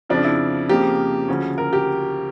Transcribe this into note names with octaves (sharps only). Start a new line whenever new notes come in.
F2 C#3 F3 D4
E4
F2 C#3 F3 A#3 G4
D2 C#3 F3 C#4
A#4
G4